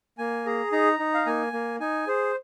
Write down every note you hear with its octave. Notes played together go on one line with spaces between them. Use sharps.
A#3 G#5
G#4 A#5
D#4 A#5
D#4
F5
A#3 G#5
A#3
D#4 G#5
G#4 C5